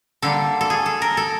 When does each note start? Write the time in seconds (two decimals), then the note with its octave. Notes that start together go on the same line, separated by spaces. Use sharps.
0.22 D3 G3 A#3 A4
0.61 A4
0.70 G#4
0.86 A4
1.02 A#4
1.17 A4